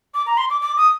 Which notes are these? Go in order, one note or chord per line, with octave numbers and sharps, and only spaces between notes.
D6
A#5
C6
D6
D6
D#6